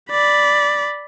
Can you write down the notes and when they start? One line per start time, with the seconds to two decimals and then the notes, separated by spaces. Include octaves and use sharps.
0.11 D5 B5